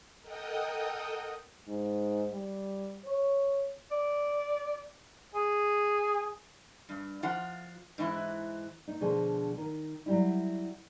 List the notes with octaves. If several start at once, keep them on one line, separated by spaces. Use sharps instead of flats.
A4 A#4 D#5 F#5 G5 D#6
G#2
G3
C#5
D5
G#4
G2
F3 F4 F#5
G#2 E3 E4
D#4
B2 D3 F3 G#4 C5
D#3
F#3 G3 E4